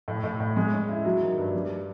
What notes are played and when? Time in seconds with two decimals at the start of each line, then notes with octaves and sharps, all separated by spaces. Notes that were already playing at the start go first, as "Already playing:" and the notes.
0.08 A2
0.24 A2
0.40 A2
0.56 G#3
0.73 C#4
0.89 E4
1.05 F#3
1.22 D#3
1.38 G2
1.53 G3